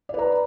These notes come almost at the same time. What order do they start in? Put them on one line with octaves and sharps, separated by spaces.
D5 B4 A#5